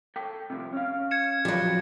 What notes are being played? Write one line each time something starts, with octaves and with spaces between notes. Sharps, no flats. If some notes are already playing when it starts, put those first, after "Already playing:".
A4 G5
C3 F3 G3
C#4 F5
G#6 C#7 E7
F3 F#3 G4 B4